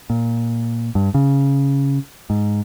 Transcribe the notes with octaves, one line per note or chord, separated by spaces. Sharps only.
A#2
G2
C#3
G#2